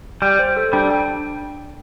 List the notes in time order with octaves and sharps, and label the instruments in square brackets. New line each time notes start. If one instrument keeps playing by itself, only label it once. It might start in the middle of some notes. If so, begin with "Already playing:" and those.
[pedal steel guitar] G3 [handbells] G5
[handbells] C5
A4
[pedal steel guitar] G3 [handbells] D4
[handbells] G5